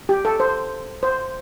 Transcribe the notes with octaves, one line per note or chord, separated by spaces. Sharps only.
G4
A4
C5
C5